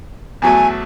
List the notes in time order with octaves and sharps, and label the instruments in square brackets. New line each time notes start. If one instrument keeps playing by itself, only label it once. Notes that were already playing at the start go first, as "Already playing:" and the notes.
[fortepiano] E2 F#3 A3 [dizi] G#5